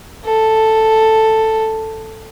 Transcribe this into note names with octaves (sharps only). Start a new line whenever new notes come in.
A4